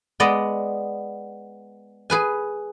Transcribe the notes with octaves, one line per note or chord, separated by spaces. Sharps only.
G#3 B3 D5 D#5
G#4 B4 G#5